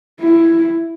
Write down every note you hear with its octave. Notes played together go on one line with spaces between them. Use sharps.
E4